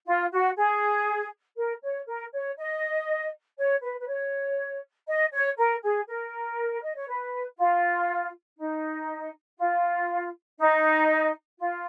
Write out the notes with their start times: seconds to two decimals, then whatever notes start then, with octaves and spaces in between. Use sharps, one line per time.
0.06 F4
0.31 F#4
0.56 G#4
1.56 A#4
1.82 C#5
2.07 A#4
2.32 C#5
2.57 D#5
3.58 C#5
3.82 B4
3.98 B4
4.07 C#5
5.07 D#5
5.32 C#5
5.57 A#4
5.82 G#4
6.07 A#4
6.82 D#5
6.95 C#5
7.08 B4
7.57 F4
8.59 D#4
9.58 F4
10.59 D#4
11.58 F4